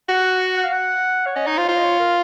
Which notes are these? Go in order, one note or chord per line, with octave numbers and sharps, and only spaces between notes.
F#4 F#5
F#5
F#5
F#5
F5
F#5
C#5
C#4 D#5
D#4 C#5
F4 C5
F4 C5
D#5
C#5
A#4